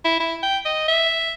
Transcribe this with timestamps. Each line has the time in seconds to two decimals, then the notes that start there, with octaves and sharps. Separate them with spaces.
0.05 E4
0.20 E4
0.43 G5
0.66 D#5
0.88 E5